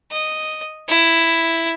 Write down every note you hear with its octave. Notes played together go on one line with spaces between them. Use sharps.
D#5
E4